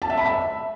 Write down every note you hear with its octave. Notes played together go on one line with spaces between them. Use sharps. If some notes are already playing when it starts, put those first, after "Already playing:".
A5
E5
B5
E5